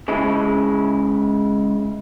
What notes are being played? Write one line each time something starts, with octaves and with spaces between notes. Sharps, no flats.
C#3 G#3 E4